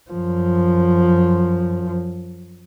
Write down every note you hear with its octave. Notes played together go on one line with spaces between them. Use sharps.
F#2 F3